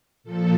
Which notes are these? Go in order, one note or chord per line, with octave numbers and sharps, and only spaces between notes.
A#2 F3 A4